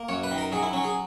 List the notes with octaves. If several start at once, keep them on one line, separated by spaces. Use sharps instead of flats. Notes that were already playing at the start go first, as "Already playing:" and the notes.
Already playing: A#3
F#2 C#5
B4
D#3
A#4
F#3 G#4
E4
F#3 C#4
G#4